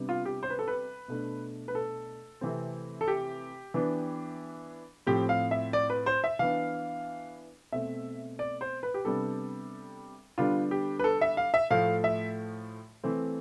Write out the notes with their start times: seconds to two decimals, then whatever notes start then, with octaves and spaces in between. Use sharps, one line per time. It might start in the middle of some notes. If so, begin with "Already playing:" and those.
Already playing: C3 G3 B3 D4
0.09 F4
0.25 G4
0.43 C5
0.50 B4
0.59 A4
0.68 B4
1.08 B2 A3 D4
1.68 B4
1.75 A4
2.41 C3 E3 A3 C4
3.01 A4
3.08 G4
3.74 E3 B3 D4
5.06 A2 F3 C4 G4
5.29 F5
5.51 E5
5.73 D5
5.90 B4
6.06 C5
6.24 E5
6.39 E3 B3 D4 F5
7.72 B2 A3 C4 E5
8.39 D5
8.61 C5
8.83 B4
8.94 G4
9.05 C3 G3 B3 D4 A4
10.38 D3 G3 B3 D4 F4
10.71 G4
10.99 B4
11.04 A4
11.21 E5
11.37 F5
11.54 E5
11.70 A2 F3 A3 F5
12.04 E5
13.04 E3 A3 C4